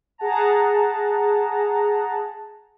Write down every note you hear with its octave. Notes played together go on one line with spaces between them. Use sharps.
G#4 F#5 A5 A#5